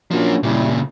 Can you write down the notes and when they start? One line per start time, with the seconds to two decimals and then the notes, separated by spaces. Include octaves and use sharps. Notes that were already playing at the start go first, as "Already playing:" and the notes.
0.11 F3 F#3 A#3 C#4 D4
0.43 A#2 C#3 G3 E4